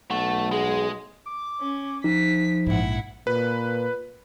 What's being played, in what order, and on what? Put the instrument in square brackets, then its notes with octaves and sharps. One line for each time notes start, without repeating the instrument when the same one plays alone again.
[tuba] B1 [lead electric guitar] A3 [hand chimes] F#5
[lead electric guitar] G#3 [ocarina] G#4
[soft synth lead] D6
[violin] C#4
[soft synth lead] F3 [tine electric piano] D#4 [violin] B6
[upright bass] A#1 G#2 [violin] E4 F#5
[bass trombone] A#2 [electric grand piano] B4